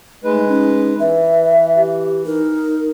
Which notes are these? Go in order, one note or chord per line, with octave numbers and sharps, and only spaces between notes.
G#3 A3 D#4 B4
C#4 D#4
E3 B4 E5
G4
D#4 A#4